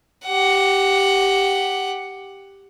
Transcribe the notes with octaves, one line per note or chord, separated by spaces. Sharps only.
G4 F#5